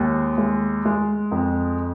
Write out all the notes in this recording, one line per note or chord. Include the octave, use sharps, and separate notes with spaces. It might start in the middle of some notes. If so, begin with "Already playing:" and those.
Already playing: D#2 G#3
G#3
G#3
F2